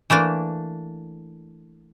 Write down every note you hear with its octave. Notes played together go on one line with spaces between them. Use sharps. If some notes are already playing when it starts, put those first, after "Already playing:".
E3 A3 A#3 D4